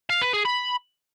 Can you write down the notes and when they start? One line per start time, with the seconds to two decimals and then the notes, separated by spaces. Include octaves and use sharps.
0.10 F5
0.22 B4
0.33 G#4
0.45 B5